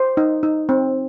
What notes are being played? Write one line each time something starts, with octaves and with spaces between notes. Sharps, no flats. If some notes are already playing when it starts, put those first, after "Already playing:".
Already playing: C5
D#4
D#4
C4